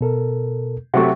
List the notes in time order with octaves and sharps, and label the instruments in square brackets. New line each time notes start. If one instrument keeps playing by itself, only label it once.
[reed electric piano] B2 A4 A#4
[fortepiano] C3 F#3 A3 [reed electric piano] F#5 C#6